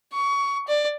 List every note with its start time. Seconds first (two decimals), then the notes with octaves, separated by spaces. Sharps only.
0.13 C#6
0.68 D5